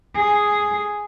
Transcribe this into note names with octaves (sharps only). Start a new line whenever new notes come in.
G#4